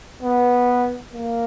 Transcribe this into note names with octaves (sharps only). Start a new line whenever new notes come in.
B3
A#3